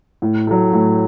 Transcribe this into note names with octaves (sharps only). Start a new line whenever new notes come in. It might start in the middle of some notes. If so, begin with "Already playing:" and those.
A2
F#3 A3
A2